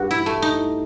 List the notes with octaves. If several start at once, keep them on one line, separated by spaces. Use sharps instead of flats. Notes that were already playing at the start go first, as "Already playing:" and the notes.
Already playing: G2 F#4
E4
A3
D#4